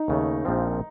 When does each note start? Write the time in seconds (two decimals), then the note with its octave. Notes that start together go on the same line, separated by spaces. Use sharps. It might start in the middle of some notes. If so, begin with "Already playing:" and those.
Already playing: D#4
0.08 D#2 C#3 A3
0.45 A#1 A#2 F3 C4